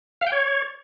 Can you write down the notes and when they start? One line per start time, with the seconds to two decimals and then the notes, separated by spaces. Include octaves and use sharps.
0.21 F5
0.27 G5
0.32 C#5